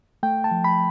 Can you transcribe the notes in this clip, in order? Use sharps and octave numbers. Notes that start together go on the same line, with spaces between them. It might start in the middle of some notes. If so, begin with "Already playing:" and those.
A3 G5
A5
F3
B5